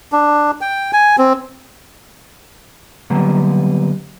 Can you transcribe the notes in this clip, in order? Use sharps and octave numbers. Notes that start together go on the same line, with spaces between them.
D4
G5
G#5
C4
D3 F#3 G3 A#3 B3